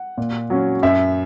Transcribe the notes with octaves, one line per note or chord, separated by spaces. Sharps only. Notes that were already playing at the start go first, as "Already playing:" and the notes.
Already playing: F#5
A#2
F#3 C#4
F#2 E5